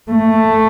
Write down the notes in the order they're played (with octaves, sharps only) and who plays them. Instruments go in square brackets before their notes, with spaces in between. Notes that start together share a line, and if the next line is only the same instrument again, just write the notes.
[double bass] A3